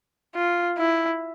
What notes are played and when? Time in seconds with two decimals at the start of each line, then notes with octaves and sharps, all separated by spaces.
0.35 F4
0.78 E4